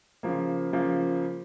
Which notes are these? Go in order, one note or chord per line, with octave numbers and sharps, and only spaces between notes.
C#3 F3 A#3
C#3 F3 A#3